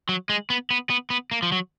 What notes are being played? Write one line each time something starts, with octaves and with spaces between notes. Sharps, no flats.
F#3
G#3
B3
B3
B3
B3
A#3
F3
F#3